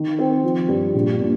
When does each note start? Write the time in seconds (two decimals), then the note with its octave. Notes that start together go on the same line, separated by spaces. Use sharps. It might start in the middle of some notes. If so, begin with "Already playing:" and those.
Already playing: D#3
0.19 C4
0.44 F3
0.69 G2
0.94 A#1
1.20 A#2